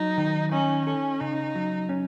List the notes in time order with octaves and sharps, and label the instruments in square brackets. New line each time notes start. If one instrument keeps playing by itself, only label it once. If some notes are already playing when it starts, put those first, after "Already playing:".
Already playing: [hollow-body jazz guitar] F#3 [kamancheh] D#4
[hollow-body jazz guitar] D#3
[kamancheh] C#4 [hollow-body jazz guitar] D#4
[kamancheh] C#4 [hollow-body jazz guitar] A4
[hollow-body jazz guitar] C#3 [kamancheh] D#4
[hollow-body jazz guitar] F#3
C#4